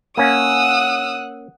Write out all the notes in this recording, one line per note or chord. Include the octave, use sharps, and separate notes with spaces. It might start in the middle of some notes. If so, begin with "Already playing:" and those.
A#3 C#4 F#5 D#6 E6 F#6